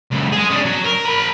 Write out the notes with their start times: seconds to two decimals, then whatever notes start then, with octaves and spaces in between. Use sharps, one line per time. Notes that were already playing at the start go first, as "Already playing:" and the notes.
0.11 C#2 F#2
0.32 G#4 D#5
0.50 C#4 D4
0.65 F#3
0.84 A#4
1.05 A#4 B5